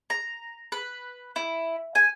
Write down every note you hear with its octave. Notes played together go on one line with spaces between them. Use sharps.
A#5
B4
E4
G#5